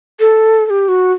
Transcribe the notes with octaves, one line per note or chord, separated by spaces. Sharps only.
A4
A4
G4
F#4